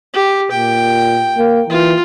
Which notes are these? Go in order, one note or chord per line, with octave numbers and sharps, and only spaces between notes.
G4
A#2 G5
A#3
E3 F4